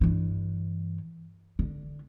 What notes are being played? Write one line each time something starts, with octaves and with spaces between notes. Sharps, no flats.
G2 E3
D3